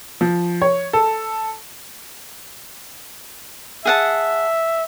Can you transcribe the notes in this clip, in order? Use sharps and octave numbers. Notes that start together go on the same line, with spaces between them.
F3
C#5
A4
G#4 E5 F#5 A5